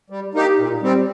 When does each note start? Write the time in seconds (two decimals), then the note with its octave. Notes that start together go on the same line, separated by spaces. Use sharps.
0.10 G3
0.34 A#3 D#4 G4
0.58 A#2
0.82 G3 C4